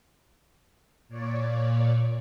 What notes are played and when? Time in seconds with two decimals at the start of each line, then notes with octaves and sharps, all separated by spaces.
1.09 A#2 C#5 D5